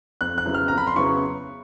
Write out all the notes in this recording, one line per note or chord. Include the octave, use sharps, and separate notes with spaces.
F2 F#6
F#6
C#3 F#3 B3 E4
F6
F2 A#5
B5
C6
C#3 F#3 B3 E4 C#6